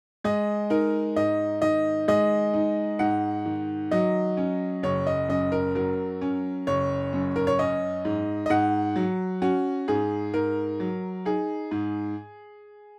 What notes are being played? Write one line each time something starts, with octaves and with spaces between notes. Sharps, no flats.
G#3 D#5
D#4 A#4
G#2 D#5
D#3 D#5
G#3 D#5
D#4
G#2 F#5
D#3
F#3 D#5
C#4
F#1 C#5
D#5
F#2 D#5
A#4
F#3 A#4
C#4
F#1 C#5
F#2
A#4
C#5
C#4 D#5
G#2
D#5
G#2 F#5
F#3
C#4 F#4
G#2 G#4
G#2 A#4
F#3
D#4 G#4
G#2